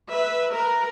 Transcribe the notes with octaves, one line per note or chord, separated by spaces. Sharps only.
B4 E5
A#4 B4